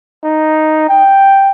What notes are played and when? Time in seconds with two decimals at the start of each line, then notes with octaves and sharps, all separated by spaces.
0.24 D#4
0.89 G5